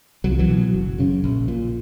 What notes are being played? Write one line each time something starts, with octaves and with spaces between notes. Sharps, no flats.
C2 F#3
F3
E3 F#3
B2
F#1
F#2 C#3
A#1
A#2